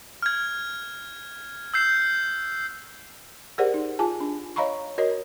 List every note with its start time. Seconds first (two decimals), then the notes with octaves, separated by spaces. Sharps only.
0.22 F6 G#6
1.74 E6 G6 C7
3.58 G4 G#4 A#4 C5 D5 F#5
3.74 D#4
3.99 F4 G#4 G#5 A5
4.20 D4
4.56 C#5 D#5 F5 A#5 B5 C#6
4.98 F#4 A#4 C#5 D#5